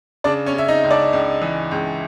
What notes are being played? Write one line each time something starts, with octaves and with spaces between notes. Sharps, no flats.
C#3 D4 D5
C#4 C#5
C#3 E5
D#4 D#5
C#2
D4 D5
C#2
E3
C#2